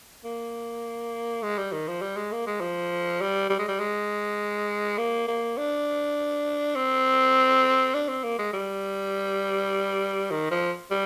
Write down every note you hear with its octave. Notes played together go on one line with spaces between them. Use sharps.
A#3
G#3
G3
D#3
F3
G3
G#3
A#3
G#3
F3
G3
G3
G#3
G3
G#3
A#3
A#3
D4
C4
D4
C4
A#3
G#3
G3
D#3
F3
G3